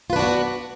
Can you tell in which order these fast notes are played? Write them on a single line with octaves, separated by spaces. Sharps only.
F4 B4 D4 F#4 B3